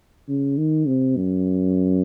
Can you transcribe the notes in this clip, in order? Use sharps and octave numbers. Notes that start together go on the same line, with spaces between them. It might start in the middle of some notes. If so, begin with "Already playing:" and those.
C#3
D#3
C3
F#2